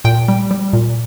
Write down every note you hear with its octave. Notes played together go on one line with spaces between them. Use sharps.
A#2 G5
G3
G3
A#2